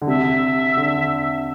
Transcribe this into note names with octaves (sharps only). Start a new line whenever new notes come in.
D3
C3 E5
D3